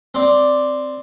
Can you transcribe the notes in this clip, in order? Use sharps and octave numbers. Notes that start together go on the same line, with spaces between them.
C4 D5